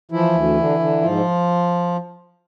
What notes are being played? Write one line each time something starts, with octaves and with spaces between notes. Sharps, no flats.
E3 F3 E4
D2
D3
D3
G#2 F3 F4